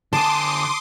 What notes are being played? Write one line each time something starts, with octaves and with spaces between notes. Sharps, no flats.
D3 G#5 A5 C6 D6 D#6